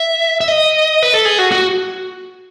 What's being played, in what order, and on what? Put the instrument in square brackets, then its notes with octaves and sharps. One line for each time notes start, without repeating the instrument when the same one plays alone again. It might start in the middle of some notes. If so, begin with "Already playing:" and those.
Already playing: [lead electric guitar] E5
E5
D#5
B4
A4
G#4
F#4
F#4